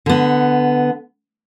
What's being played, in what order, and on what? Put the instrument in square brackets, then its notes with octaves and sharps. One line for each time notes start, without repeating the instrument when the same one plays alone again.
[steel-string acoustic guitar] D3 B3